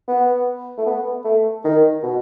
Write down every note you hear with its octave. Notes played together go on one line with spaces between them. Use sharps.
B3
A3
B3
A3
D#3
B2